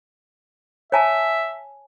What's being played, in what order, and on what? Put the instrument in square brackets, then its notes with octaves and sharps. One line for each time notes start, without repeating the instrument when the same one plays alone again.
[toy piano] C#5 G#5 A5 [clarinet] E5